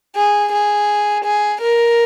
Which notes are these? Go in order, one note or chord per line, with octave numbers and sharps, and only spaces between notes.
G#4
G#4
G#4
A#4